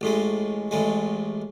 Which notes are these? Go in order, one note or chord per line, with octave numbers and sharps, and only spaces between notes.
A1 A2 G#3
A1 A2 G#3